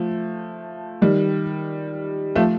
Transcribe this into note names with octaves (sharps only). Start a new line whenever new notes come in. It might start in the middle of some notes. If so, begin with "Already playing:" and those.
Already playing: F3 A3
D#3 G3
F3 A3